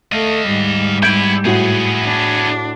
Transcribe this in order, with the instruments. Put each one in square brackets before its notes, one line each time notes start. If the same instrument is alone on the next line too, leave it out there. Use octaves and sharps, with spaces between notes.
[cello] A3 [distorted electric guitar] D#5 F5
[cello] G#2 G3
[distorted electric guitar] B3 E4 [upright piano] G6 G#6 D7
[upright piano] A2 F#4 [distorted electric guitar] B3 G#4
[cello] D4